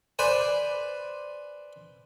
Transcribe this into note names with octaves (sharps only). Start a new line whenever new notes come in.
B4 C5 D5 G#5